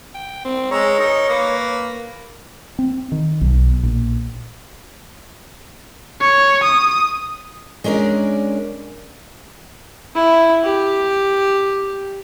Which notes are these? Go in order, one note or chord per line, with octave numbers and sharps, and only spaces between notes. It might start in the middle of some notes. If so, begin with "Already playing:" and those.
G5
C4
G#3 C#5 A#5 E6
D#4 A#4 A#5
A#3 B4
C4
D#3
B1
A#1
C#5
D#6
G#3 C#4 D4 A#4 D5
E4
G4